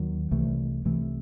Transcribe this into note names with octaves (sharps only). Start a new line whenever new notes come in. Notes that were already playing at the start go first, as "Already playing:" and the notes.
Already playing: D#2 D#3 F#3
C2 C3 E3 A3
C2 C3 E3 A3